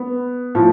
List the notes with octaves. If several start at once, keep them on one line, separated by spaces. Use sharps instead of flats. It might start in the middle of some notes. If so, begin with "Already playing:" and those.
Already playing: B3
A2 F3